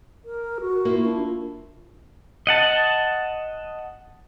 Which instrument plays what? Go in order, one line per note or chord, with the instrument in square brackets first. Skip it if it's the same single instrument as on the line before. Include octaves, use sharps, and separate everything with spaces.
[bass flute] A#4
F#4
[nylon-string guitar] A#3 E4 F4
[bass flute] D4
[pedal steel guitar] D#5 F#5 A5